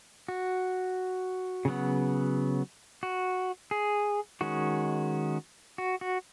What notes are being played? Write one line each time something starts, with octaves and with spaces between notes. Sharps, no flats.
F#4
C#3 F#3 B3
F#4
G#4
D#3 G#3 C#4 F#4
F#4
F#4